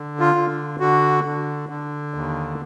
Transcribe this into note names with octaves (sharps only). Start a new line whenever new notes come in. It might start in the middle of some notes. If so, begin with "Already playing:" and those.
Already playing: D3
F4
D3
D3 F#4
D3
D3
D#2